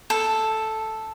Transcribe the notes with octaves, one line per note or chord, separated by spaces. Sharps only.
A4